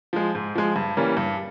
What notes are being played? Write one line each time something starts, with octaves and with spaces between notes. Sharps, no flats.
F3 G#3
G#2
F3 G#3
G2
E3 G3 A#3 C#4
G2